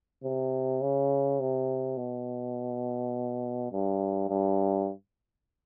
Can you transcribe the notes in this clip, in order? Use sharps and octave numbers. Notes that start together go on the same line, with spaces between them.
C3
C#3
C3
B2
G2
G2